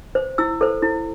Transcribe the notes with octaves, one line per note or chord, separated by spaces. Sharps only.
C5
E4 E6
A4 C5
E4